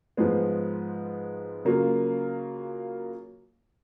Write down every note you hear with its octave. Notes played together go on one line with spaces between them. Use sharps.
G#2 F3 G#3 B3
C#3 F#3 A#3 F4